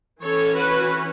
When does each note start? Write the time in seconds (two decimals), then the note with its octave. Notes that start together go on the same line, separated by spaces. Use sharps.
0.21 E3 C#4 A4 C#5
0.55 F#4 B4